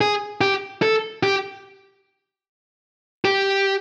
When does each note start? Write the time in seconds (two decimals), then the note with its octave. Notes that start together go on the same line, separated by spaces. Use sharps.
0.01 G#4
0.41 G4
0.82 A4
1.23 G4
3.25 G4